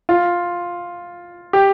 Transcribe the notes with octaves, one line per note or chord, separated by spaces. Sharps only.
F4
G4